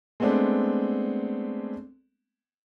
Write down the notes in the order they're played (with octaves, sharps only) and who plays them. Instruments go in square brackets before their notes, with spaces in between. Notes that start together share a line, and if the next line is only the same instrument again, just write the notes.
[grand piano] G#3 A3 B3 C4 D4